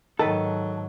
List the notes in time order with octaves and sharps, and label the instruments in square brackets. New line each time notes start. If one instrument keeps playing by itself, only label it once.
[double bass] G#2 F#3 [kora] D#3 B4 [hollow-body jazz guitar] A4